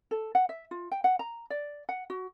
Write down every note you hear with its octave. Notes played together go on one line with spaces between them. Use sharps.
A4
F#5
E5
F4
G5
F#5
A#5
D5
F#5
F#4